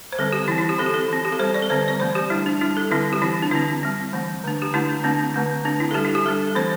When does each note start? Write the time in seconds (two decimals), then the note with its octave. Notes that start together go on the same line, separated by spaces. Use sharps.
0.12 C5
0.18 D3 G3 C4 A4
0.33 G4
0.48 E3 C4 E4
0.58 E4
0.69 G4
0.79 E3 C4 A4
0.86 G4
0.94 A4
1.09 E3 C4
1.25 G4
1.32 A4
1.39 G3 C5
1.43 C4
1.54 D5
1.62 A4
1.70 D3 G3 C4 C5
1.88 D5
2.00 E3 A3 C4 C5
2.15 G4
2.30 G3 D4 E4
2.46 D4
2.61 G3 D4 E4
2.77 A4
2.91 D3 G3 C4 E4
3.13 G4
3.22 E3 C4 E4
3.42 D4
3.51 D3 C4 E4
3.83 G3 C4
4.13 E3 A3 C4
4.44 D3 A3 D4
4.62 G4
4.73 D3 A3 D4 E4
5.04 D3 A3 C4 D4
5.34 D3 A3 C4
5.64 D3 C4 D4
5.80 E4
5.91 A4
5.94 G3 D4 G4
6.05 E4
6.15 G4
6.26 G3 D4 A4
6.47 A4
6.55 E3 A3 C4 C5